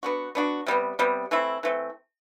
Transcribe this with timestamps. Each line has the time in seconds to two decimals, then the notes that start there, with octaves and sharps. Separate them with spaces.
0.03 B3 D4 F#4
0.35 B3 D4 F#4
0.66 C3 G3 B3
0.99 C3 G3 B3
1.31 E3 A3 C4 E4
1.63 E3 A3 C4